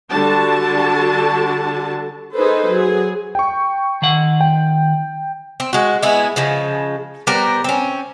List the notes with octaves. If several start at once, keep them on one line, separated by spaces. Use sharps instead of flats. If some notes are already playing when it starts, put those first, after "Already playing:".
D3 G3 D4 F#4 A5
D#4 G#4 A4 B4 C5
F#3 G#4
G5 C#6
D#3 F#5
G5
C4
G#3 F#4
G#3 B3 E4 G#4
C#3 F3 G#3
G3 B3 A#4 C5
C4 C#4